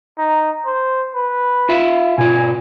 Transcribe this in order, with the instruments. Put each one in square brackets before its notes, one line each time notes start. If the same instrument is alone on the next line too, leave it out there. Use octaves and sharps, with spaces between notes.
[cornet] D#4
C5
B4
[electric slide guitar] F4 E5 F5
[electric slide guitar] B2 F4 [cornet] G#5